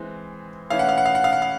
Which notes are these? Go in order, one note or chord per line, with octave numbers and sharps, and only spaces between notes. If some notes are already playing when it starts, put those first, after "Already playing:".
Already playing: E3 G#3 C4
E3 A3 C#4 F5
F#5
F5
F#5
F5
F#5
F5
F#5
F5